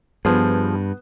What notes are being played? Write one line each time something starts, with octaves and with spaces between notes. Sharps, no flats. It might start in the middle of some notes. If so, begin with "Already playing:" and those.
G2 F3 B3 G#4